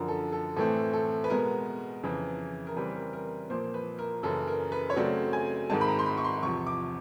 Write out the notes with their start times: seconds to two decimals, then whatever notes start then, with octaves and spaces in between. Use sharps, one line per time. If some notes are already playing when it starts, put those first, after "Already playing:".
Already playing: F#2 D3 F3 A#4
0.08 A4
0.32 A4
0.56 A2 E3 A3 C4 A4
0.93 A4
1.24 B4
1.30 B2 G#3 B3 A#4
2.03 F2 C#3 E3
2.67 A#4
2.76 C#3 E3 G3 C4 B4
2.95 A#4
3.13 A#4
3.50 A#2 F3 A#3 C5
3.74 B4
3.99 A#4
4.23 F#2 C#3 E3 A4
4.48 A#4
4.72 B4
4.90 C#5
4.96 C#3 F#3 A3 C4 D5
5.33 G#5
5.70 G#2 D#3 G#3 C4 A5
5.81 B5
5.88 A#5
5.99 C6
6.06 B5
6.17 C#6
6.24 C6
6.43 E2 C3 F3 C#6
6.67 D6